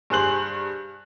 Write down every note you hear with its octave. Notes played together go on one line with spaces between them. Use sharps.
G2 G#4 C5 F#6 F#7